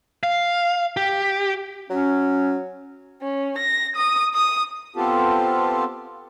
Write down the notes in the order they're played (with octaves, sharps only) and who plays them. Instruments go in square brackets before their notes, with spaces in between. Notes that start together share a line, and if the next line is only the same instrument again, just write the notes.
[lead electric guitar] F5
G4
[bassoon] F#3 [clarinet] C#4
[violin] C#4
A#6
D#6
D#6
[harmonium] B3 C4 F4 G4 A4